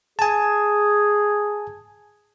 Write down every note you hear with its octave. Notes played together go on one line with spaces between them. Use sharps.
G#4 G#5 A5